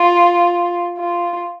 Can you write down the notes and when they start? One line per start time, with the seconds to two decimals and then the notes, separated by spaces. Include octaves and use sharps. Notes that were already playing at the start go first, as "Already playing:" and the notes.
Already playing: F4
0.98 F4